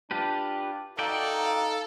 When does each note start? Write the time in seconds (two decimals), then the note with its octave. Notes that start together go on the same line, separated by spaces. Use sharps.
0.11 D4 F4 G4 B4
0.99 D#4 F#4 A4 D5 F5 G5